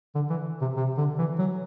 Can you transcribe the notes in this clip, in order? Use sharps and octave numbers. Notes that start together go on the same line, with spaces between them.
D3
E3
C3
C3
D3
E3
F#3